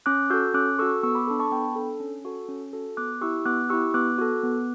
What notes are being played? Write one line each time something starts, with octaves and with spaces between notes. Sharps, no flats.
C#4 D6 F#6
F#4 A4 E6 G6
C#4 D6 F#6
F#4 A4 C#6 E6
B3 C#6 E6
B5 D6
D4 A4
A5 C#6
B3 G5 B5
D4 A4
C#4
F#4 A4
C#4
F#4 A4
B3 D6 F#6
E4 G4 C#6 E6
B3 D6 F#6
E4 G4 C#6 E6
B3 D6 F#6
F#4 A4
B3